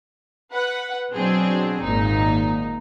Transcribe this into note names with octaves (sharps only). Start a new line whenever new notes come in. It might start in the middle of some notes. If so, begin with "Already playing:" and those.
B4 F#5
B2 F#3 C4 D4 G#4
G#1 A#2 D#4